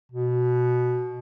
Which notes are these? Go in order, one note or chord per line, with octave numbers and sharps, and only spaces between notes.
B2